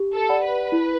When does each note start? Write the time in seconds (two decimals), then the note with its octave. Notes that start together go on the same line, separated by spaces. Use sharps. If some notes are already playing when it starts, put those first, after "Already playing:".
Already playing: G4
0.15 A4
0.29 D5 F#5 B5
0.44 B4
0.72 E4